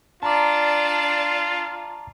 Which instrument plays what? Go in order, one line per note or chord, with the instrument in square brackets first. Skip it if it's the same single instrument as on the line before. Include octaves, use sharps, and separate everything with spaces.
[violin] D4 D5 [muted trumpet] F4 [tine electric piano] A5 A#5 D6